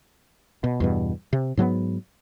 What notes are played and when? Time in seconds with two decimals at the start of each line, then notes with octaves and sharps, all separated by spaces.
0.64 B2
0.80 E2 G2 B2
1.33 C3
1.57 G#2 F#3 G#3 B3